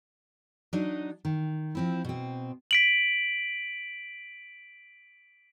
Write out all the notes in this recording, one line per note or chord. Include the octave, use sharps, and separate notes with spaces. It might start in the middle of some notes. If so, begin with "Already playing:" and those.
F#3 D4 D#4 D#5
D#3
F3 C4 E4
B2 C4
B6 D7 F#7